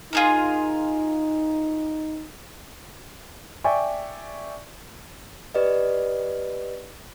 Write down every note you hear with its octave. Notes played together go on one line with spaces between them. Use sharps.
D#4 F4 G#4 A#4
D5 E5 G5 G#5 C#6
G4 B4 D5 D#5